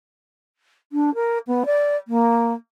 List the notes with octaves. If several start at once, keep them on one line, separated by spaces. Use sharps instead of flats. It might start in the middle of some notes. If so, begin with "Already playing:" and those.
D4
A#4
B3
D5
A#3